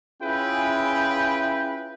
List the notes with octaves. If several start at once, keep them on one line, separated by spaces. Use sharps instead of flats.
C#4 E4 F4 G#4 B4 G5